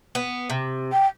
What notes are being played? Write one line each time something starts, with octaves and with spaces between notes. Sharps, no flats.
B3
C3
G5